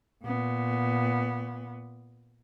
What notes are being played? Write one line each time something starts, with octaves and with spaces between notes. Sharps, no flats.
A#2 B3